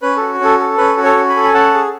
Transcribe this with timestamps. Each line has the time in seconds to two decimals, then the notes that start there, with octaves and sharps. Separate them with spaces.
0.02 C#4 B4
0.17 F#4 A4
0.40 C#4 A4
0.59 A4
0.78 C#4 B4
0.97 F#4
1.04 A4 C#5
1.16 C#4
1.29 G#5 B5
1.36 A4
1.44 G#5
1.54 C#4 F#5 A5
1.74 G#4